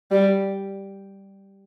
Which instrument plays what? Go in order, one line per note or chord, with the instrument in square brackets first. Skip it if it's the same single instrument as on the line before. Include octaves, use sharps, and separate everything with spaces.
[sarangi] G3